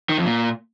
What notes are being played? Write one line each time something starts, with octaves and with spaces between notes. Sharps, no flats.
D#3
F2
A#2